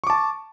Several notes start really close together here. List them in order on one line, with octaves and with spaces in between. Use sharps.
C#6 D6 A5